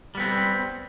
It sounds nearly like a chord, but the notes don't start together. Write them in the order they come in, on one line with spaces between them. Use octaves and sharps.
G3 B3 C4